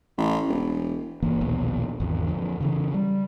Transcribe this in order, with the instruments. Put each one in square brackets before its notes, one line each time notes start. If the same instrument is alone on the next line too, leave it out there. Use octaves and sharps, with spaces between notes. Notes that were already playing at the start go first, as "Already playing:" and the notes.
[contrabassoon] A1
E1
[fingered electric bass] G1 E3 A#3
A#1 D#2 B2
G#1 E2
F2 D3
C#3 E3
G3